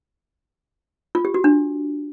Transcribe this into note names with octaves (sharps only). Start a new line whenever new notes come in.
F4
G4
F#4
D4